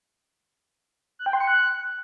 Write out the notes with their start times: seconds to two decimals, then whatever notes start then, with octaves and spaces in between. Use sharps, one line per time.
1.19 F#6
1.26 G5
1.33 C6
1.40 C#7
1.47 F#6